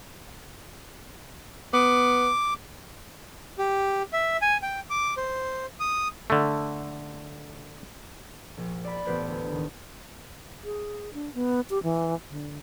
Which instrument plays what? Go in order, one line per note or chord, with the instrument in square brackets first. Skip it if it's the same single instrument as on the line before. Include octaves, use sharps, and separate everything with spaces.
[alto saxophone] B3 [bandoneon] D6
[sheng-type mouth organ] G4
E5
G#5
G5
D6
C5
D#6
[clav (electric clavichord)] D3 A3
[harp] A#1
D5 B5
A1 B3 G4 B4 C5 G6
D2
D#3
[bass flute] G#4
D4
B3
G4
E3
D3